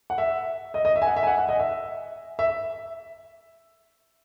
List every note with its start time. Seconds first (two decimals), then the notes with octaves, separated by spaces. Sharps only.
0.10 F#5
0.18 E5
0.74 D#5
0.85 D#5
0.96 E5
1.02 G#5
1.06 F#5
1.16 E5
1.23 G#5
1.27 F#5
1.38 F#5
1.49 D#5
1.59 E5
2.39 E5